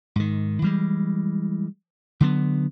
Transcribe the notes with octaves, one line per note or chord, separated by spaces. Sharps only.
G#2 D#3
E3 G3 G#3
D3 F#3 B3